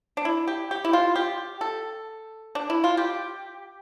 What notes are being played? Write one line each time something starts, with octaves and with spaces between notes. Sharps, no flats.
D4
E4
G4
G4
E4
F4
G4
A4
D4
E4
F4
G4